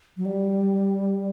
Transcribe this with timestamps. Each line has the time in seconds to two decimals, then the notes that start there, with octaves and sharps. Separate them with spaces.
0.17 F#3
0.25 G3